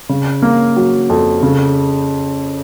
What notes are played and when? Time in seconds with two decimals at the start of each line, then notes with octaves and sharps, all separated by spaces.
0.09 C#3
0.42 A#3
0.76 F#3
1.10 F2
1.43 C#3